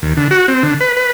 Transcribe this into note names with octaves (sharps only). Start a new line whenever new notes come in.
D#2
D3
F#4
C4
D3
B4
B4